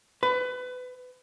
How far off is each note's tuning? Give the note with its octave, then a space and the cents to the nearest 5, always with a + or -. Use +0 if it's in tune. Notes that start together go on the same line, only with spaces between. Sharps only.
B4 +25